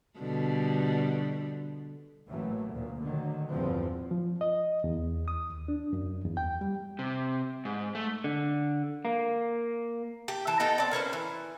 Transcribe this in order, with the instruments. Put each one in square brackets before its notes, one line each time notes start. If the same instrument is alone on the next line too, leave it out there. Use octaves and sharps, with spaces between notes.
[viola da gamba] B2 D3 G3
[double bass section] A1 A2 E3 F#3 A3 A#3
D2 A#2
D3 D#3 F#3
A#1 E2 G2 F3 C4
[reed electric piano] F3
D#5
E2
D#6
D#2
D4
F#2
E2
G5
G3
[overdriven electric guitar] C3
G#2
A3
[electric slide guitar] D3
A#3
[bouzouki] G4
E3 A5
B3 D#4 A4 G5
C4 D5
A#3 C#4 B4 C5
E3